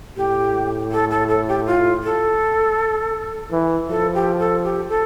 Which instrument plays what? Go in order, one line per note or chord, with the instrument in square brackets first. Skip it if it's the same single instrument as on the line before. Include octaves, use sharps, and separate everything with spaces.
[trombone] A2 [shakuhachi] G4
[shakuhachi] A4
A4
A4
G4
F4
A4
[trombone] E3
[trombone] F3 [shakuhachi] A4
[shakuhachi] G4
A4
G4
A4